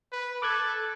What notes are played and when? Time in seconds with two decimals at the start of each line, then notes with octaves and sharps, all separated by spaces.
0.12 B4
0.42 A4 D6 F#6 G#6